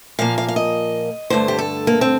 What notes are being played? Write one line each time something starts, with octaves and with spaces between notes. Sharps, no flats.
A#2 F3 A#3 F5
F5
F5
D#5
G2 D3 A3 C5
G4
A4
A#3
C4